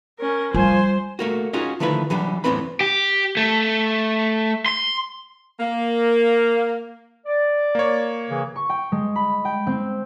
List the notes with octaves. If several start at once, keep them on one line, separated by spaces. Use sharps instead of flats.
C#4 A#4
F3 G3 C5 G#5
A3 A#3 F#4
C#4 D#4 F4 F#4 G#4
D3 D#3 F3 A3 E4 B4
E3 F#3 G3 D4
E2 A2 E3 C4 B4 B5
G4
A3
C6
A#3
D5
A#3 C#5
C#3 E3
C#6
G5
G#3
B5
G5
C4